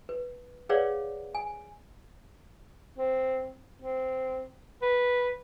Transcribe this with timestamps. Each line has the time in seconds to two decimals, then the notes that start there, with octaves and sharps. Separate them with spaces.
0.09 B4
0.69 G#4 B4 C#5 D5 F5 F#5
1.35 G#5
2.98 C4
3.82 C4
4.82 B4